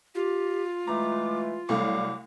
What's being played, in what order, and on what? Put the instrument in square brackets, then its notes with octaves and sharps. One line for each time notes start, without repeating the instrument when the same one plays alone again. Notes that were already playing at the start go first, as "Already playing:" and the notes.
[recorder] F4 [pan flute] G4
[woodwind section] E3 G#3 A3 [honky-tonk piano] A#5 [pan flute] D6
[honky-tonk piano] C2 A3 F5 [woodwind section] F#3 G3 [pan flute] D6